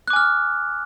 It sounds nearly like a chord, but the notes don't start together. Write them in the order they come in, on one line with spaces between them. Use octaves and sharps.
F#6 D6 G#5 F6